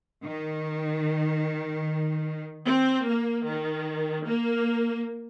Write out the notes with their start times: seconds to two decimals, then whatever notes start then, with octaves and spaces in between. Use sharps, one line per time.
0.24 D#3
2.66 C4
3.05 A#3
3.46 D#3
4.26 A#3